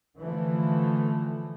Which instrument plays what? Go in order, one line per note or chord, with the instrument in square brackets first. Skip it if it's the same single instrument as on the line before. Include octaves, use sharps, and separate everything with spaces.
[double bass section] D3 E3 F3 A3